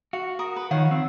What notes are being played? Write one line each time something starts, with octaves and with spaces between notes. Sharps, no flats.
F#4 F5
A#4 D#6
B4
D#3 F3 C#5 F5 F#5
C4